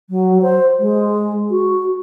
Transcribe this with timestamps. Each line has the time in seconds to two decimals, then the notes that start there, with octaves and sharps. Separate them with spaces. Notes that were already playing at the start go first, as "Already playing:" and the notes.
0.10 F#3
0.42 C5
0.79 G#3
1.50 F#4